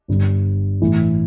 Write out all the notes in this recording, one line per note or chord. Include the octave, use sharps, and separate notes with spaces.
G1 G2 G3
A1 A2 E3